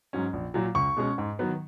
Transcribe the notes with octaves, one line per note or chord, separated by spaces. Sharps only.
G#2 F#3 C#4
A#1
A#2 F#3
C#2 C#6
B2 G#3 C#4
G#2
D#3 F#3 B3